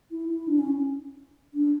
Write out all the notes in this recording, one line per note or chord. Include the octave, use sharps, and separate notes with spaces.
E4
E4
D4
C#4
D4